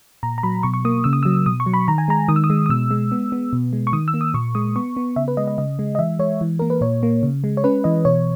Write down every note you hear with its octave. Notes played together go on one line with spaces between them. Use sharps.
A#2 A#5
A#5
F#3 B5
B2 C#6
C#6
A#3 D#6
C#3 E6
D#6
F#3 E6
B2 D#6
C#6
F#3
B5
D#3 A#5
G#5
G#3 A#5
D#3 D#6
E6
D#6
G#3
D#6
B2 E6
G#3
B3
B3
B2
G#3
C#6
D#3 D#6
E6
A#3
D#6
A#2 C#6
G#3 D#6
B3 C#6
B3
C#3 E5
B4
G#3 D#5
D#5
C#3 D#5
G#3
D#5
E3 E5
G#3 C#5
E3
A#3 A#4
B4
A#2 C#5
A#3
C#3
G#3
C#5
C#4 B4
E3 D#5
B2 C#5